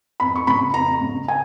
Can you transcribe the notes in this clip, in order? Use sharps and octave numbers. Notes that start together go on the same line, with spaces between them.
F2 B5
C#6
C#3 B5
F2 A#5
C#3
G#5